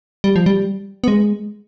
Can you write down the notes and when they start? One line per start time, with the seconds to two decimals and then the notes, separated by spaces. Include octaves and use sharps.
0.24 G3
0.36 F3
0.46 G3
1.04 B3
1.08 G#3